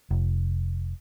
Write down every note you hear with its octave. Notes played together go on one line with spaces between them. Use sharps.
F1